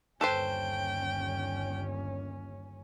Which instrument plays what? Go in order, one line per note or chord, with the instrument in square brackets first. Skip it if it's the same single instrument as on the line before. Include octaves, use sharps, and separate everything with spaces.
[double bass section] G1 D#2 C#4 [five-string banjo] A4 B4 C5 [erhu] G5